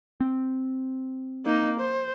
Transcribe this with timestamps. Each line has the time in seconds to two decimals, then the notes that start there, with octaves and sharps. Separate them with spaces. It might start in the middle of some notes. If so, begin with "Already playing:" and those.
0.20 C4
1.46 A#3 D#4
1.80 C5